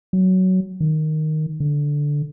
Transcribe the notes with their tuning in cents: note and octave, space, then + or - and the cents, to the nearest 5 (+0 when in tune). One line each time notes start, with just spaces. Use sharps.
F#3 +10
D#3 -5
D3 -5